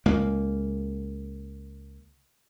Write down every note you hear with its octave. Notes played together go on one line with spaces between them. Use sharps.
C#2 A#3